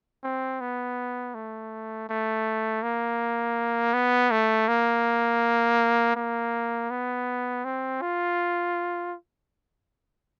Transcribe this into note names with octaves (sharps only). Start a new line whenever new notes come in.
C4
B3
A3
A3
A#3
B3
A3
A#3
A#3
B3
C4
F4